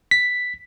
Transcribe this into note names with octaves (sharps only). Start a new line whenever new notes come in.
B6